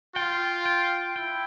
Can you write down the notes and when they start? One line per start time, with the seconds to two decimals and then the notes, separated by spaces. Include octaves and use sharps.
0.16 F4 G5
0.66 G5
1.16 E4 G5